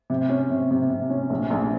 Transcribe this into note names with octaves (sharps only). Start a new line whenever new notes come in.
C3
C#4
C3
C3
C3
C#4
A#1
A#1